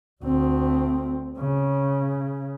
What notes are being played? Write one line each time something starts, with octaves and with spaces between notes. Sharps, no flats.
D2 C4
C#3